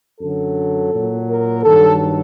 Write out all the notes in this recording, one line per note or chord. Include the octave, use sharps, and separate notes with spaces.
F#2 D3 F#3 A4
A#2 F#3
A#4
G2 D#3 F#3 A4